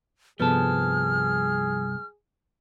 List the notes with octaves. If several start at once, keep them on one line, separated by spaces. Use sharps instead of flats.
C2 G2 F3 B3 G#4 A4 F6